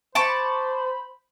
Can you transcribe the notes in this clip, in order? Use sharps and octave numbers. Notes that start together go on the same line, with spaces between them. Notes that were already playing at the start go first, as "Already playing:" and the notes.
C5 A5 B5 C#6 D6